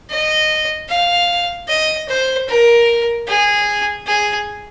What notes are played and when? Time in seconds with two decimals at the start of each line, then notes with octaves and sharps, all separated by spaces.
0.11 D#5
0.89 F5
1.69 D#5
2.08 C5
2.48 A#4
3.27 G#4
4.06 G#4